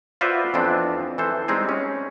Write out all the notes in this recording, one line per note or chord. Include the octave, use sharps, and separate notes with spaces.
F4 F#4 B4 C5 D5 E5
F2 E3 B3 C4 D4
E3 A4 C5
G3 G#3 C4 D#4 G#4
C#4